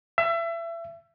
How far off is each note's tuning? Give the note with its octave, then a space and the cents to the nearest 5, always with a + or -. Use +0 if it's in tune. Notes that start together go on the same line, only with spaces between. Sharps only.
E5 +30